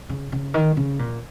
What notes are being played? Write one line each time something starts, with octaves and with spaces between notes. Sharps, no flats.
C#3
C#3
D#3
C#3
A#2